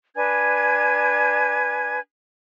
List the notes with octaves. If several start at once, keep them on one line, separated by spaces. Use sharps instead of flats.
D4 B4 G#5 G#6